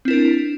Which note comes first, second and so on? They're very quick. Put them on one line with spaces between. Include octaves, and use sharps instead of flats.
C4 E4 A#4 D4